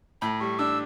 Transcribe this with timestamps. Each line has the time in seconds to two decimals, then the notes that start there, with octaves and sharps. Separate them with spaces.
0.22 A2 B5
0.40 G3 C#6
0.59 D4 E6